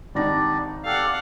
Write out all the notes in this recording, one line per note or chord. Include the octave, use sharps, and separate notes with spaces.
G#1 G3 D4 D#4 D5 A#6
G4 A4 D5 F5 F#5